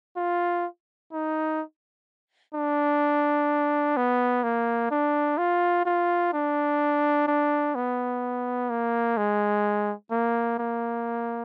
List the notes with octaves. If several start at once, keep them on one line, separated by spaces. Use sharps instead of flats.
F4
D#4
D4
B3
A#3
D4
F4
F4
D4
D4
B3
A#3
G#3
A#3
A#3